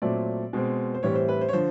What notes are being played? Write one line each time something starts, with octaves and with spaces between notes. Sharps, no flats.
A#2 F#3 A3 C4 D5
B2 G#3 C4
C5
A2 E3 G3 C4 C#5
C5
B4
C5
C#5
D3 F3 C5